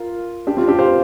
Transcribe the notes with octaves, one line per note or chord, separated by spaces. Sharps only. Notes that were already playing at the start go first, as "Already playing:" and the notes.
Already playing: F4 A#4
D4 G4
C4 F4
D4 G4
C5 F5